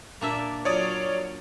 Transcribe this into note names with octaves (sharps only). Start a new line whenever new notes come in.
A#2 A#3 D4 D5 E5
F#3 F4 C#5 D5 D#6